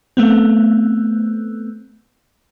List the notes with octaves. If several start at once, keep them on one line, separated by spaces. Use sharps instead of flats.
A3 B3 C4